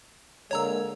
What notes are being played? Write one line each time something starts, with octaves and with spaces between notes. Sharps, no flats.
D3 G#3 A#3 C#5 A#5 E6